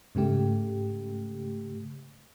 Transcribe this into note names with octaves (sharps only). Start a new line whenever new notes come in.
G#2 C#3 A3 G4